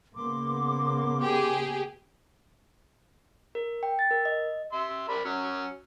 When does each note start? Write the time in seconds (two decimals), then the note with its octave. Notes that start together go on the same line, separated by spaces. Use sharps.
0.15 C#3 A#3 B3 C6 D6
1.21 G4 G#4
3.55 A#4
3.83 G5
3.99 A6
4.11 A#4
4.25 D#5
4.72 E5 C6
5.09 A#4 D5 B5
5.25 F#3 C#4